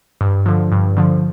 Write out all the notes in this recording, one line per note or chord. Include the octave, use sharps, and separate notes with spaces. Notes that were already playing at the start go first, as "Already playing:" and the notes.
G2
D3 F3
G2
D3 F3